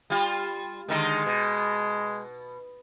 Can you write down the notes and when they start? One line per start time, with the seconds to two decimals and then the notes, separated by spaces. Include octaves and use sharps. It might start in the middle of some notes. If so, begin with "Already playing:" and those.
0.10 G3 F4
0.88 D3 D#3 G#3 D#4
1.26 B2